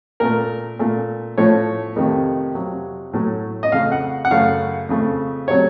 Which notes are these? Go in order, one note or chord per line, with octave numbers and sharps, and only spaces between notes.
A#2 A3 A#4
A#2 A3
A2 F3 A3 C#5
F2 C3 D#3 A3
F2 C3 F#3
A2 F#3 A3
D#5
F2 C#3 A3 F5
F#5
F#5
F#2 C#3 A3 F5
F2 C#3 A3
C3 F#3 A3 C#5